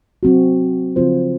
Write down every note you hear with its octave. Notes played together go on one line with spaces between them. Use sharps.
F#3 C4 F#4
C#3 F3 C4 F4 C5